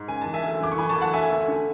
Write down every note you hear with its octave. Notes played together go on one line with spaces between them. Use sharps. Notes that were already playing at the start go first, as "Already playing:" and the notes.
Already playing: G#2
C#3 G#5
E3 A5
E5 G#5
D2
E3 D6
C#6
E3 G#5 B5
A5 C#6
D2
F#5 A5
D2 E5 G#5
D2
D3